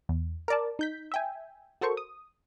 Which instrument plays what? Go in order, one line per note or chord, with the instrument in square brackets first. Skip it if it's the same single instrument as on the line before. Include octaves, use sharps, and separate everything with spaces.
[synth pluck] E2
A#4 D5 A5
D#4 G6 B6
E5 G5 G#5
F#4 A4 A#4 C5 C#6
D#6